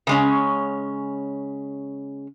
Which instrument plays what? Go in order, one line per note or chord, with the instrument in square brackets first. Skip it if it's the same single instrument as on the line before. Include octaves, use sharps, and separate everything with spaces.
[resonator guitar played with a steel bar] C#3 G#3 C#4